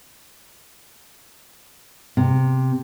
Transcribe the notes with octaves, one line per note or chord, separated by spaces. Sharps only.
C3